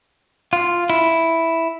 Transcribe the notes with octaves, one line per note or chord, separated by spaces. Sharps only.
F4
E4